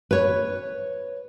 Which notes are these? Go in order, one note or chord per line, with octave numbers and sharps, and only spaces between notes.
B4 C#5